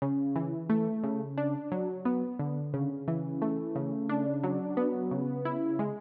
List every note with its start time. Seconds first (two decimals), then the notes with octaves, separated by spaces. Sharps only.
0.02 C#3
0.36 E3
0.70 A3
1.04 C#3
1.38 D4
1.72 F#3
2.05 B3
2.39 D3
2.74 C#3
3.08 E3
3.42 A3
3.75 C#3
4.09 D4
4.44 F#3
4.77 B3
5.11 C#3
5.45 E4
5.79 G#3